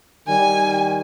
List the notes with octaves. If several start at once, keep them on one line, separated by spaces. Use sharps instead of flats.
D#3 G3 G#5